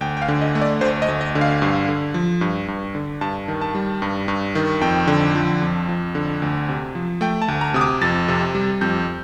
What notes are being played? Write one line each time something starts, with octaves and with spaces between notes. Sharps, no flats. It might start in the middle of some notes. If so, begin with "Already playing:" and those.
D2 G5
G5
F5
D3
D#5
A3
D5
D2 C5
D#5
D2
D#5
D3
F5
G2
D3
F3
G2
G2
D3
G2 A5
D#3
A5
G3
G2
G2
D#3
F2 G5
D3
F3
F2
F2
D3
D2
C3
F3
A3 G5
A5
D2
A#5
C3 D#6
D6
F2 A6
C3
G3
F2 G6